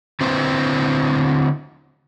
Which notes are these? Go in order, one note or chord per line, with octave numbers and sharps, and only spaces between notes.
D3 C4 E4 B4 C5